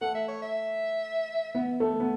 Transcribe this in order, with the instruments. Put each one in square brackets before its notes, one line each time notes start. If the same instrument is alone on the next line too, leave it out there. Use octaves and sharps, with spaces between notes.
[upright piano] A3 [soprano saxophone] F#5
[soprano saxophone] E5
C#5
E5
[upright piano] B3
A3
B3